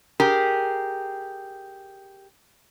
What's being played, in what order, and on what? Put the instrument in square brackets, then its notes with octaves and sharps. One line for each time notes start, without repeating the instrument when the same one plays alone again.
[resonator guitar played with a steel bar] G4 G#4 A#4